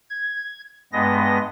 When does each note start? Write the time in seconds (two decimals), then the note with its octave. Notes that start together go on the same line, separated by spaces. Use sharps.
0.10 G#6
0.93 G2 G#3 B3 D#5 A#6